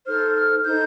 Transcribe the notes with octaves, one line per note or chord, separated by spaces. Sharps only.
D#4 A4 C5 F6
F6
D#4 A4 C5 G6